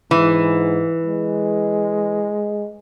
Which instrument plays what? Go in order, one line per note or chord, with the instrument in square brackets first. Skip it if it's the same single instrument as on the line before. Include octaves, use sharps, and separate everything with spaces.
[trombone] G#2 [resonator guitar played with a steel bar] E3
[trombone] G#3